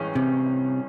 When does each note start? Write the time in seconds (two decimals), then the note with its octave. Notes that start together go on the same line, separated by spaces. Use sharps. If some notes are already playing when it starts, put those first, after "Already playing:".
Already playing: A1 G2 E3 G#3 C#4
0.15 C3